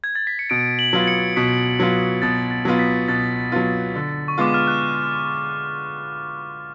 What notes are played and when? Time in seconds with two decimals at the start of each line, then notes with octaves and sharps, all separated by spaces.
0.04 G#6
0.15 A6
0.27 B6
0.39 C#7
0.50 B2 D7
0.79 F#7
0.93 F#3 B3 F4
1.08 C#7
1.36 B2 B6
1.80 F#3 B3 F4
2.22 B2 A6
2.51 A6
2.65 F#3 B3 F4
2.79 B6
3.08 B2 A6
3.52 F#3 B3 F4
3.95 D3
4.28 C#6
4.38 G#3 B3 F4 D6
4.54 F6
4.68 F#6